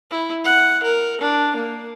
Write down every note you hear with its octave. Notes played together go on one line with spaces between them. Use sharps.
E4
F#5
A#4
D4
A#3